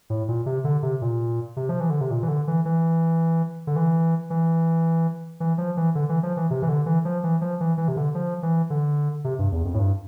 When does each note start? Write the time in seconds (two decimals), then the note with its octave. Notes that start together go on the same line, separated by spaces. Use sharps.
0.10 A2
0.28 A#2
0.46 C3
0.64 D3
0.83 C3
1.02 A#2
1.56 C3
1.69 F3
1.80 E3
1.90 D3
2.01 C3
2.11 A#2
2.23 E3
2.28 D3
2.47 E3
2.65 E3
3.67 D3
3.76 E3
4.30 E3
5.40 E3
5.58 F3
5.77 E3
5.95 D3
6.09 E3
6.23 F3
6.37 E3
6.50 C3
6.62 E3
6.69 D3
6.86 E3
7.05 F3
7.23 E3
7.41 F3
7.60 E3
7.78 E3
7.88 C3
7.97 D3
8.15 F3
8.43 E3
8.70 D3
9.24 C3
9.39 G2
9.52 E2
9.65 F2
9.74 A2
9.79 G2